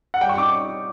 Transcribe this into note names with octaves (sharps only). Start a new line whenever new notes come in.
F#5
G3 G5
C#6
D#4 D6